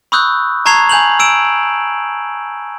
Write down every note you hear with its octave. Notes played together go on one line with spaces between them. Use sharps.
B5 C#6 D#6 E6 F#6 G6
A5 A#5 C#6 G#6 C7 F7
G#5 G6 F7 F#7
E6 D7 E7